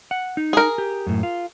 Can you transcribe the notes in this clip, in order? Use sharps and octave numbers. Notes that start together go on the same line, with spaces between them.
F#5
D#4
G#4 A#4
G4
F#2 A2
F4